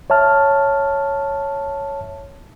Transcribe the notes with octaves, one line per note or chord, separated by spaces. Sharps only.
C#5 E5 A5 F6